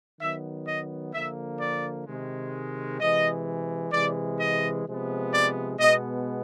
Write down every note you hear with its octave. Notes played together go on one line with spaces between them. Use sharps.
D#3 F#3 B3 E5
D#5
D3 F3 A#3 E5
D5
C3 D#3 G#3
C3 E3 G#3 D#5
C3 E3 G#3 D5
D#5
C3 F3 G#3 B3
D5
B2 G#3 B3 D#5